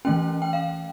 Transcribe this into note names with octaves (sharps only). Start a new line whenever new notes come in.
E3 A3 C#4 G5
G5
F5